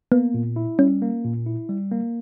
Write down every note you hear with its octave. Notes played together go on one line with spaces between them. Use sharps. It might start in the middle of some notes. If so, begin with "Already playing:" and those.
A#3 B3
A#2
E4
G3 C#4
A#3
A#2
E4
G3
A#3